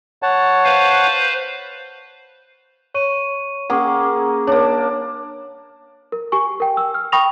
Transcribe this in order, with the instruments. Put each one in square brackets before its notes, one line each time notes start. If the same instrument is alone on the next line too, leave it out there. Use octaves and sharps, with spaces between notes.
[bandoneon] C#5 F#5 A5
[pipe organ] B4 C5 F5
[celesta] C#5 C#6 D#7
[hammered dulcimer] A#3 C#4 G#4 [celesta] F#5 C#6
[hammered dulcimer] A#3 D4 [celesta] C#5
[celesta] A#4
G4 G#5 C#6
A#4 G5
E6
F6
G5 B5 C#6 D#6 A#6 F7